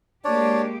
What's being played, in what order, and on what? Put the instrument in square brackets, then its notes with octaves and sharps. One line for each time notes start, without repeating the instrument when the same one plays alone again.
[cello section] G#3 A#3 G4 [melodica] D4 C#5 D5